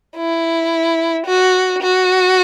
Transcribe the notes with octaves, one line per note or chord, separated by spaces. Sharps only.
E4
F#4
F#4